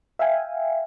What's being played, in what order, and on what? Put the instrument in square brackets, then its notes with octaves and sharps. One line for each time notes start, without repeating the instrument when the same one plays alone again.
[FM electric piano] E5 F5 G5 G#5